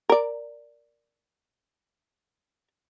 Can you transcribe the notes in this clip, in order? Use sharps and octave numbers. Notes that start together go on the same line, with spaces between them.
A#4 D5